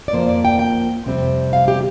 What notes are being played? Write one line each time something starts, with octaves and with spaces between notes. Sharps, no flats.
D5
F2 F3 A#3 C5
D5
G5
G5
F2 C3 G3 C4
F5
G4